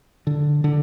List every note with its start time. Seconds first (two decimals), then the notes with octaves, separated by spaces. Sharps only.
0.27 D3
0.64 D3